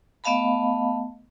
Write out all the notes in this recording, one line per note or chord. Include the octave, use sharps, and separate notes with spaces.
A3 B3 D#5 F5 A5 B5